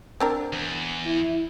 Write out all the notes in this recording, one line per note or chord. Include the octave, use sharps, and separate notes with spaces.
C4 D4 A#4
E2
E4